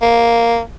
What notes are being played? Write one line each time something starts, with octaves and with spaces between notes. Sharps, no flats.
A#3